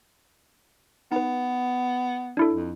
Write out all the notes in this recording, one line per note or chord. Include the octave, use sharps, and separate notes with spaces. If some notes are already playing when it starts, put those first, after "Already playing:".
B3 D#4 B4
D4 E4 A4
F2